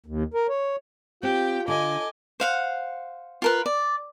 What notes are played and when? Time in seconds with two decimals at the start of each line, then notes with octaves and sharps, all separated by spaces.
0.06 D#2
0.34 A#4
0.49 C#5
1.23 C4 F4 G4 G5
1.68 D3 D#5 G#5 D6
2.40 C5 F5 F#5
3.42 F4 A#4 B4
3.66 D5